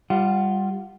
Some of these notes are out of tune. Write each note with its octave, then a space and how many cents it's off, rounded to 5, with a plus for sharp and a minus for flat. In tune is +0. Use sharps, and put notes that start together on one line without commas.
G3 +5 F4 +0 F#5 +25